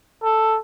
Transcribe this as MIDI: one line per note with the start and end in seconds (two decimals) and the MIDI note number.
0.24 0.59 69